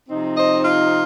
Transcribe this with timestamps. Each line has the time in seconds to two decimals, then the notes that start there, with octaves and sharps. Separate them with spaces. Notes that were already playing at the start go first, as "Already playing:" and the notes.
0.09 C3 F3 C4 D#4
0.37 C5 D#5
0.65 F4